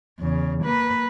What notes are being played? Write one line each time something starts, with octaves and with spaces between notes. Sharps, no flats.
E2 C#3
A#3 B4